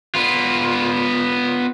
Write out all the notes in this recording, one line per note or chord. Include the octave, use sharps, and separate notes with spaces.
B3 F4